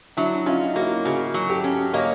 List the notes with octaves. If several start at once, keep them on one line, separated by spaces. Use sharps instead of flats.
F#3 D4 E4
C#4 D#4 F4
A#3 E4 F#4
C#3 F#4 G#4
F#3
G4 A4
C#4
A#3 C#5 D#5